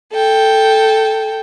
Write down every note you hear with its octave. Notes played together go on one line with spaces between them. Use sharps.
A4 G5